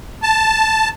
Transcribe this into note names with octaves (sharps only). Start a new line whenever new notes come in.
A5